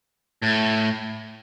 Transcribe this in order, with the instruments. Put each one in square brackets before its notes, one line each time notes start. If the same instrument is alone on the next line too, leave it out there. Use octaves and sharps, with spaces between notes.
[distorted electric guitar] A2